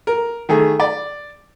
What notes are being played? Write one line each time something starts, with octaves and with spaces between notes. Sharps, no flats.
A#4
D#3 A3 G#4
D5